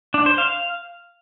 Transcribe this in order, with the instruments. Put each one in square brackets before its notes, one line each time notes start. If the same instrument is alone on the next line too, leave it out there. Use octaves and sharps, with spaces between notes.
[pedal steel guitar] D4
C5
F5